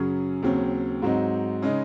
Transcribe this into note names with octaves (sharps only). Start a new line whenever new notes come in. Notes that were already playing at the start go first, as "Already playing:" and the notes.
Already playing: F#2 C#3 F#3 C#4 G#4
D#2 C#3 F#3 C4
G#2 F#3 C4 D#4
C#3 G#3 D#4